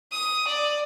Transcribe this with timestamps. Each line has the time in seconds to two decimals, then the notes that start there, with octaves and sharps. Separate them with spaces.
0.12 D#6
0.47 D5